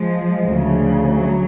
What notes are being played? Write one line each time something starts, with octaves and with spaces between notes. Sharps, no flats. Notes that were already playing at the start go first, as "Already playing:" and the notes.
Already playing: F3 G#3
D2 C#3
F#3